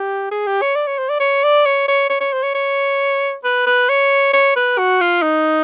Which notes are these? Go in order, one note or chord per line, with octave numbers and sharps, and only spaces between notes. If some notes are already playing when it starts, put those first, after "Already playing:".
Already playing: G4
G#4
G4
C#5
D5
C#5
C5
D5
C#5
D5
C#5
C#5
C#5
C#5
C5
C#5
C#5
B4
B4
C#5
C#5
B4
F#4
F4
D#4